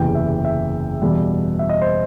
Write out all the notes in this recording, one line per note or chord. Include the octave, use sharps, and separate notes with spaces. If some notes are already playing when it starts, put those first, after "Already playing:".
Already playing: F#1 E2 C3 E3 G5
E5
E5
E2 B2 G3
E5
D#5
C5